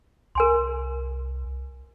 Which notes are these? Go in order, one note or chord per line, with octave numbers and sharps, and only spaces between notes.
C2 A#4 G#5 C6